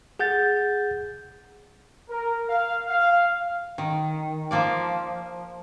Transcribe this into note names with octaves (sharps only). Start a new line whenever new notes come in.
G#4 F#5 G6 A6
A#4
F5
F5
D#3
F3 A#3 D5